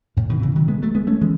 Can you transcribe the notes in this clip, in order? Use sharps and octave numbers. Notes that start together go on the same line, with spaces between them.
A2 C#3
B2 D#3
C#3 E3
D#3 F#3
G#3 B3
F#3 A3
G#3 B3
A3 C#4
E3 G#3